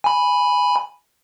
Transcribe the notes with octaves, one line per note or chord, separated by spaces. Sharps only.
G#5 B5